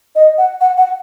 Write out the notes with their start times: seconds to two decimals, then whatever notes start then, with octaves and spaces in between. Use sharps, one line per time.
0.16 D#5
0.38 F#5
0.61 F#5
0.77 F#5